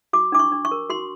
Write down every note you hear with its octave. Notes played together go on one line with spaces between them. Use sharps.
F#4 D6
D4 D6
C#6
D4
C#6
A#4
F#4 C6